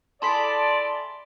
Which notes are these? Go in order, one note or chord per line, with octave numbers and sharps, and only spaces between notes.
E4 G#4 A4 D5 A5 B5 C6 B6